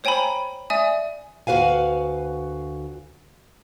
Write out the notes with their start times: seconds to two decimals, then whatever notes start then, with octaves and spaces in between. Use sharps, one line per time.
0.04 C5 C#5 G5 G#5 A#5 B5
0.70 D5 E5 G#5 D#6
1.47 D2 F#4 B4 F5 G#5